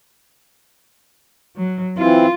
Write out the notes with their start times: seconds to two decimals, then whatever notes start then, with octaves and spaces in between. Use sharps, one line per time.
1.56 F#3
1.98 E3 C4 E4 F4